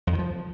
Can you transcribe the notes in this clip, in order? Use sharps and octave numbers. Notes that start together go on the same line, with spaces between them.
F2
D#3
F3